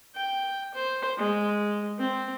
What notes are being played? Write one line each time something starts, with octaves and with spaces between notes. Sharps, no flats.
G5
C5
G#3
C4